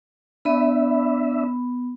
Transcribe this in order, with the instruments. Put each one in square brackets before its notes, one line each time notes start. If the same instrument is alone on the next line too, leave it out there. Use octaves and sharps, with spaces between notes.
[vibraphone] B3 B5 [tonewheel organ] D4 E5